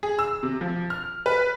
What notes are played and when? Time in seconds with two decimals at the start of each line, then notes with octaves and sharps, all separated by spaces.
0.03 G#4
0.19 E6
0.43 C3
0.61 F3
0.90 F6
1.26 B4